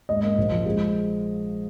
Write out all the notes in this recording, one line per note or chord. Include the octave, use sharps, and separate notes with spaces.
G#2 D#5
A#3
A#1
F3
G#3